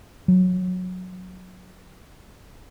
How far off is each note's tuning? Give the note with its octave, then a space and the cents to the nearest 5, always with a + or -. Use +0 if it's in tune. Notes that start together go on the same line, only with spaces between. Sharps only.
F#3 -15